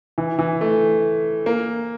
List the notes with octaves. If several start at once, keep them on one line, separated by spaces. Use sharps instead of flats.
E3
E3
A3
A#3